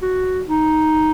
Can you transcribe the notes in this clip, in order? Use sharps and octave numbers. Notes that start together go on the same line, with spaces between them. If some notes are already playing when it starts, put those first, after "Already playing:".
F#4
D#4